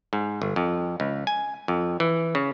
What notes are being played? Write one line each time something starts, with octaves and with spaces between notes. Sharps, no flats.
G#2
G1
F2
C#2
G#5
F2
E3
C#3